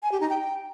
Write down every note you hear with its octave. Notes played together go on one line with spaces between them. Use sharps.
G#5
G4
D#4
G5